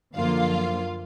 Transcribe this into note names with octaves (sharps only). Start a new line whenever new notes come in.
F#2 D3 F3 A#3 F4 F5